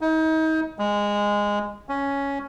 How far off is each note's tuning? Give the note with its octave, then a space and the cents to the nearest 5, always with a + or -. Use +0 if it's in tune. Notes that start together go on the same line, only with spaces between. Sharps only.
D#4 +35
G#3 -15
C#4 +5